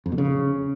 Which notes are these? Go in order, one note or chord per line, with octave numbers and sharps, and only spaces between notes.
F2
B2
C#3